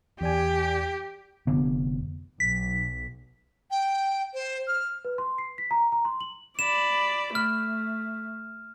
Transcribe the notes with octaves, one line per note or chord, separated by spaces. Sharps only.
E2 G4 D5 G#5
F1 D3 B3
B1 B6
G5
C5
F6
B4
C6
C7
B6
A#5
A#5
C6
F#7
D5 B5 E7
A3 F6